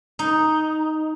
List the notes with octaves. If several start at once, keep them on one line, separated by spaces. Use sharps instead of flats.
D#4